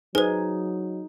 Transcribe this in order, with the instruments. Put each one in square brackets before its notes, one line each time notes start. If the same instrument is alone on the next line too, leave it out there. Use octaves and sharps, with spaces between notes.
[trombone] F#3 [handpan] D#4 [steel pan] G#4 [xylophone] B4 C5